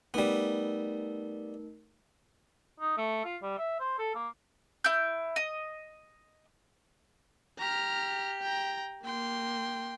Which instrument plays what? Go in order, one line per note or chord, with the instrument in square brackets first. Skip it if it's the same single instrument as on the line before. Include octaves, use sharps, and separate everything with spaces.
[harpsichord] G3 B3 [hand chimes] A3 D#4 A#4
[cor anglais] D#4
A3
F4
G3
E5
C5
A4
A#3
[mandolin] E4 G6
D#5
[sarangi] G4 [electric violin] A#5 F6
[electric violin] G5 A#5
[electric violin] A#3 C6 [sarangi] G5